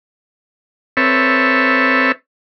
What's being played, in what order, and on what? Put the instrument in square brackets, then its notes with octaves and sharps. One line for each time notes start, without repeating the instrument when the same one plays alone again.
[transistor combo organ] C4 A4 B4 C#5 E5